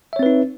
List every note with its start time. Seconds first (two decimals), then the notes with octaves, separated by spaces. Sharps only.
0.13 E5
0.16 C#5
0.19 C4
0.23 B4
0.26 D#4